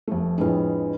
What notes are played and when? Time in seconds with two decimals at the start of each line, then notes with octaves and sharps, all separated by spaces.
0.08 F1 A3
0.38 F2 A2 G#3 D4 B4